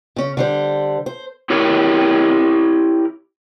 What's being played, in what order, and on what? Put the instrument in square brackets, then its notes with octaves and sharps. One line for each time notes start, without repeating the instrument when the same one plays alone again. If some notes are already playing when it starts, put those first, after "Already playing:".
[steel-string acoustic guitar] C#3 C#4
D3 G3 C5
C5
[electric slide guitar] E4 G4 A#4 C#5